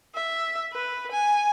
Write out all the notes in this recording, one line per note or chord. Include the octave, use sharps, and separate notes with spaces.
E5
B4
G#5